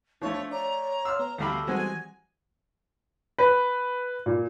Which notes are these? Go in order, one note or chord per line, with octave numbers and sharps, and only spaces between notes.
F3 A3 D4 C#5
C#5 D5 A#5
C6 E6 F6
B3 A#5
D2 G3 A4 F5 B5 A#6
E3 G3 G#3 C4 F#4 G#5
B4
A#2